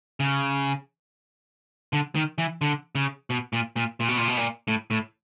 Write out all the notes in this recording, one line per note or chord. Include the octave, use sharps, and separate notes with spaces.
C#3
D3
D#3
E3
D3
C#3
B2
A#2
A#2
A#2
B2
A#2
B2
A#2
A2
A2